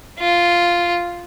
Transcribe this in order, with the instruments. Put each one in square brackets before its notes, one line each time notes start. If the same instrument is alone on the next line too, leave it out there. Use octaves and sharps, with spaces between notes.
[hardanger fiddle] F4